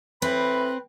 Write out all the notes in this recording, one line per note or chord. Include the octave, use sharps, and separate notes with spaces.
A2 E3 C4 B4 B5